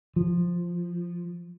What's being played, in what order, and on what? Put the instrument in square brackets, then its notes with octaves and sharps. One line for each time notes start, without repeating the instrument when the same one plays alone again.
[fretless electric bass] F3